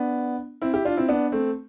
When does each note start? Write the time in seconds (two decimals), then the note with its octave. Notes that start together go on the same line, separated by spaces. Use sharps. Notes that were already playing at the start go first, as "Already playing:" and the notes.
Already playing: B3 D4
0.62 C4 E4
0.74 E4 G4
0.85 D4 F4
0.97 C4 E4
1.09 B3 D4
1.32 A3 C4